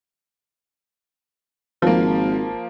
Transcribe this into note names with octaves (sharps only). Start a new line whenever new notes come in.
G#1 F3 A#3